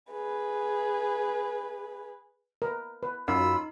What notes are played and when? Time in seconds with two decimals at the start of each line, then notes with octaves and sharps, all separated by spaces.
0.11 G#4 B4
2.62 A#4 B4
3.03 B4
3.28 F#2 D#4 F4 B5 E6